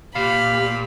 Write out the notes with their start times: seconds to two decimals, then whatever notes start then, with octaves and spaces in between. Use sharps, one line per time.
0.15 A#2 G4 F5 B5